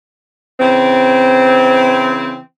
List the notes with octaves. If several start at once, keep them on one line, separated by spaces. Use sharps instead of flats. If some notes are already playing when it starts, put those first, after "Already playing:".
C#3 E3 C4